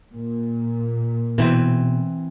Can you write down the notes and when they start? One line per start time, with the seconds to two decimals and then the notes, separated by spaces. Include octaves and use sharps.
0.12 A#2
1.38 B2 E3 C4 B4